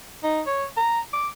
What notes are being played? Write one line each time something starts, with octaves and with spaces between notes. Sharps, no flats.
D#4
C#5
A#5
D6